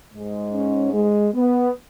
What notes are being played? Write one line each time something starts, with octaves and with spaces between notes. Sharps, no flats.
G#2 G#3
C#4
G#3
B3